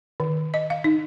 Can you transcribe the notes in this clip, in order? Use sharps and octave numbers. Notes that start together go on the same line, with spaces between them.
D#3
D#5
F5
D#4